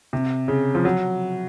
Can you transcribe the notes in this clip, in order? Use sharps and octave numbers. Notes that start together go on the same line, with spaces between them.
C3
C#3
F3
F#3